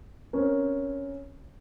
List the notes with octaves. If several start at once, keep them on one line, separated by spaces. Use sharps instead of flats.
C4 C#4 A#4